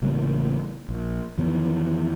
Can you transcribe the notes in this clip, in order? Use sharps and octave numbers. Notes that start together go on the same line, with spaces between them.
A1 C#3 G3 A#3
A#1
F2 D#3 E3 B3